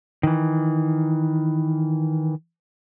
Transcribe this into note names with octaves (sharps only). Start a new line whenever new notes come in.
D#3 E3